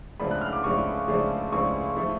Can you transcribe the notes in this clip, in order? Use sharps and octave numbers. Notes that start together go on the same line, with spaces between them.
C#2 C#3 F3 A3 D4 B5
F#6
F6
D6
C#2 C#3 F3 A3 D4 C#6
C#2 C#3 F3 A3 D4
C#2 C#3 F3 A3 D4 C#6
F3 A3